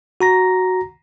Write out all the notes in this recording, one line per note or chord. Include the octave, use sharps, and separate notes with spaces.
F#4 A#5 A#6